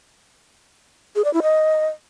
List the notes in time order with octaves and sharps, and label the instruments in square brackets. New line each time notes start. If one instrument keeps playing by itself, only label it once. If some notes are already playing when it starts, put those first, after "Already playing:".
[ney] G#4
D5
E4
D#5